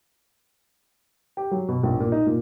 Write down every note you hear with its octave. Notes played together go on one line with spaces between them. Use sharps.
G4
F#3
B2
A#1
A#2
D#4
A#2